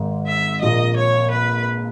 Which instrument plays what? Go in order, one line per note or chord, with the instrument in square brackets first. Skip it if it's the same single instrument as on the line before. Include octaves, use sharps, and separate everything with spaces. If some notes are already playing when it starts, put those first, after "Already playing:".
Already playing: [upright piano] G#1 G#2 D#3
[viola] E5
[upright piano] A#1 A#2 A#3 [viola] D#5
[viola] C#5
B4